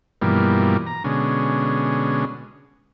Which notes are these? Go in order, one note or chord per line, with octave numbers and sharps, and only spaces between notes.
G2 B2 E3 F3 G3 A#3
A#5
B2 D3 G#3 C#4